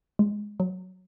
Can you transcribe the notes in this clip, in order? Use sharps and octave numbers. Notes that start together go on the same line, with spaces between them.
G#3
F#3